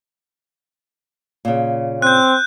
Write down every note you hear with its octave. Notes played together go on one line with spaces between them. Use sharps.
A#2 C#3
C4 F#6 G6